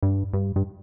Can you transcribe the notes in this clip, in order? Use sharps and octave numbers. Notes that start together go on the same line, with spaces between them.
G2
G2
G2